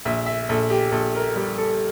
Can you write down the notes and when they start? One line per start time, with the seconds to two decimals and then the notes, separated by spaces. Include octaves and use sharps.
0.05 A#1 E5
0.26 E5
0.49 A#1 A4
0.70 G4
0.92 A#1 A4
1.15 A#4
1.36 G3 G4
1.58 A4